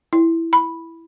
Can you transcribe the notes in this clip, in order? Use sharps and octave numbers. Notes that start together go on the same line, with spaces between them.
E4
B5